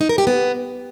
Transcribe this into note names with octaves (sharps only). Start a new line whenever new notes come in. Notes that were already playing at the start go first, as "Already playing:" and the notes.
D#4
A#4
G4
B3